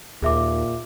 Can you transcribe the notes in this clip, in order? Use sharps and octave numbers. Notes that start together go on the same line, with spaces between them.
D#2 A#2 G#4 E5 D6